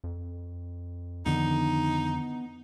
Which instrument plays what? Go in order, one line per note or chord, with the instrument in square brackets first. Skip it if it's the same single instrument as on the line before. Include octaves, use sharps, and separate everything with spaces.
[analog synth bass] F2
[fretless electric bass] F2 D3 D#3 [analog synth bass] B3 [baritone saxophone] D#4